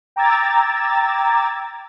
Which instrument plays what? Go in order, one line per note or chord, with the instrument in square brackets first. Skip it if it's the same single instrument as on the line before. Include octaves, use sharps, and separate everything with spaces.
[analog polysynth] G5 A#5 D6 E6 G#6 A6